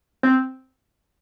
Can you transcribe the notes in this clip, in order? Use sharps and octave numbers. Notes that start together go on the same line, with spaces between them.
C4